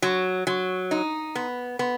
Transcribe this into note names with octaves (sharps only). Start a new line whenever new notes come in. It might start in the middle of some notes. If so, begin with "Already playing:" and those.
F#3
F#3
D#4
B3
B3